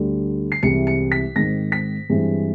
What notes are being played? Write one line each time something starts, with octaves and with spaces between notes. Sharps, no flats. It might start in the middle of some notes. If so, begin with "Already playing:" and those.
Already playing: D2 D3 G3
C7
C2 C3 E3 G#3 C#7
C#7
B6
G#2 D#3 G#3 C4 A#6
B6
G2 E3 G#3 C4